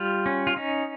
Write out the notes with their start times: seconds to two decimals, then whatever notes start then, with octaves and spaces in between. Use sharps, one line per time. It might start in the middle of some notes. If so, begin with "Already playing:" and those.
Already playing: G3 F4
0.26 C#4
0.47 F4
0.56 C#4 D#4